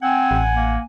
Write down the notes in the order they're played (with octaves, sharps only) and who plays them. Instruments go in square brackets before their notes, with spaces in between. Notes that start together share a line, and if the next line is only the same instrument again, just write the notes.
[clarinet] C4 [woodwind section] F#5 G#5
[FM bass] A1
[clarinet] A#3